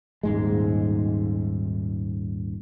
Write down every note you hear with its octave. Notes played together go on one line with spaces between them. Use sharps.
D#1 G#2 G#3